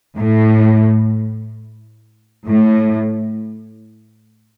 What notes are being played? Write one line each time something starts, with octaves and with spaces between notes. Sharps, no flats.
A2
A2